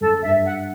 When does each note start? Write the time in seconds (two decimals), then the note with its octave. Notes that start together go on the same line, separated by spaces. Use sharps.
0.01 F#2 A4
0.23 G2 E5
0.46 F#5